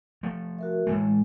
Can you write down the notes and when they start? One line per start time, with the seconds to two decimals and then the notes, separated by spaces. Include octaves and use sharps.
0.23 F3 A3
0.59 F#4 A#4 E5
0.87 A2 E3 G#3 A3